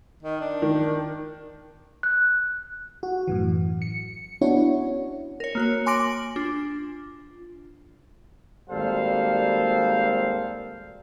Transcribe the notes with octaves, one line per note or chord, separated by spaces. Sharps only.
D#3
D4
D#3
F#6
F#4
F#2 A2 E3
C#7
B3 C#4 D4 E4 F#4 C#5
A#4 C#5
A#3 F#4 C#5
G#5 C6 D6 A#6 D7 F#7
D4 F4
G#1 G3 A#3 A4 C5 F5